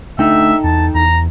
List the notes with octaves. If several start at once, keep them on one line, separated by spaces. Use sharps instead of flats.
A3 D4 D#4 A4 E5 G5
E2 A5
E2 A#5